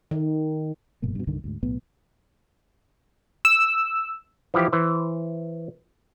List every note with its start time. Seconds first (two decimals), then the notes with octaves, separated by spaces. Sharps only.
0.11 D#3
1.02 F1 G2 B2 A#3
1.15 G2 B2
1.27 C2 G2 D3 D#3
1.44 D2 G#2
1.63 B1 A2 B3
3.45 E6
4.54 E3 F3 E4 G4
4.72 E3 C5